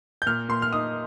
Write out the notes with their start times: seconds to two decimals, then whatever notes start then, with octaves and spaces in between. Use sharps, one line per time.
0.22 G6
0.26 A#2 F6
0.49 A#2 C6
0.62 F6
0.72 D#4 D#6